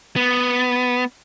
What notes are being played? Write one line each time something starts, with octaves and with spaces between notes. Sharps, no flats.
B3